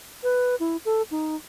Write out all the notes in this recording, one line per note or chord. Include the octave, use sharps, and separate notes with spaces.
B4
E4
A4
D#4